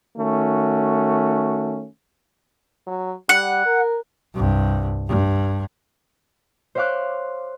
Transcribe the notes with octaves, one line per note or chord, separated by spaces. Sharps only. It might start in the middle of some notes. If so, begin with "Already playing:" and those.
D#3 A3 C#4 F#4
F#3
G3 F#5
A#4
C2 G2
G2
C5 C#5 E5 F5 D6 F#6